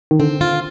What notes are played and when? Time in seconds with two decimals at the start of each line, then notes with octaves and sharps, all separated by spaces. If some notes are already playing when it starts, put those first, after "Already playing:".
0.11 D#3
0.20 D3 C4
0.41 F4